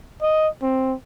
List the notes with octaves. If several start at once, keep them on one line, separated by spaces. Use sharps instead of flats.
D#5
C4